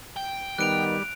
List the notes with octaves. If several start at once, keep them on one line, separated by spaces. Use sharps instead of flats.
G5
D#3 G3 B3 F#6 D7 F7